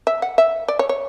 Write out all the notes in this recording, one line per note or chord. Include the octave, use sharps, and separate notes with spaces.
E5
F#5
E5
D5
C#5
C#5